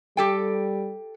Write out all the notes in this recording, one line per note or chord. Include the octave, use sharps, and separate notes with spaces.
G3 G4 A4 G5